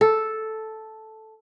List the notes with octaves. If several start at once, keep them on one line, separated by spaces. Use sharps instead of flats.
A4